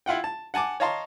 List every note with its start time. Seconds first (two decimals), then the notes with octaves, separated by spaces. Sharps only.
0.06 E4 F4 F#5 G5
0.24 A5
0.54 F#5 G#5 A5 D6
0.80 C#5 D#5 F5 A5 A#5 C6